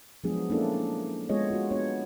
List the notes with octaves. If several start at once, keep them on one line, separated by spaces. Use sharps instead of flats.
F3 F#3 G#3 B3 D4 G#4
A#3 C#4 D4 E4 A4
G#3 B3 F4 G#4 C#5 D#5
F4 F#4
B3 D4 C#5